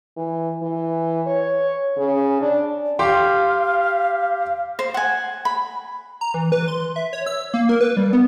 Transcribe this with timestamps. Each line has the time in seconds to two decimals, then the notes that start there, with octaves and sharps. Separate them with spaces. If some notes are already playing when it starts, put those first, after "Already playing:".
0.17 E3
0.62 E3
1.27 C#5
1.98 C#3
2.41 D4
2.99 G4 F5 G5 C6
4.79 C5
4.94 F#5 G#5
5.45 B5
6.21 A#5
6.34 E3
6.52 B4
6.68 C6
6.96 E5
7.13 C#5
7.26 E6
7.54 A#3
7.69 A#4
7.81 B4
7.97 G3
8.13 B3